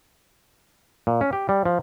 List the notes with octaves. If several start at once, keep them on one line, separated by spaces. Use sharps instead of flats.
A#2
C#4
G4
G3
F3